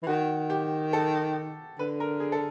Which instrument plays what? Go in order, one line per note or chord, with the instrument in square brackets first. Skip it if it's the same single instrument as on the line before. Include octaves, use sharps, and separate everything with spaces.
[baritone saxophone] E3
[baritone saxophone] D#3 [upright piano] F#4
[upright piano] G4
A4
[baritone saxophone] D3 [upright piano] B4
[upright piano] A#4
G#4
A4